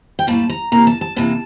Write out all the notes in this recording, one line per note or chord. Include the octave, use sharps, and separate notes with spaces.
G5
A2 G3 A#3 A5
A#5
C3 E3 A#3 A#5
A5
A5
C3 E3 A#3 A5